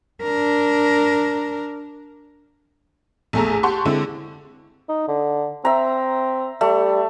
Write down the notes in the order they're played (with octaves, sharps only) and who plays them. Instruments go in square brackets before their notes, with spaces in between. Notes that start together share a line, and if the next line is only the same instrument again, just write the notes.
[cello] D4 A#4
[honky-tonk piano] A#1 E2 A3 G#4 A4 A#5
G4 F#5 A5 C6 C#6
D3 G#3 C4 E4
[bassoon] D#4
D3
[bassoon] C4 [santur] E5 A#5
[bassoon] G3 [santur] A3